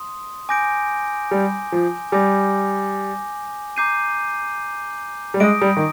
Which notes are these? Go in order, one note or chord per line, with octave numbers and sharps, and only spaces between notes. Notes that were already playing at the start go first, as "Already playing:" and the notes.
Already playing: C6 D#6
G#5 D6 G6 A#6 D7
G3
F3
G3 G#5 D6 G6 A#6
A#5 D6 G6 C7 D#7
G3
G#3 D#6 A#6 D7
G3
D#3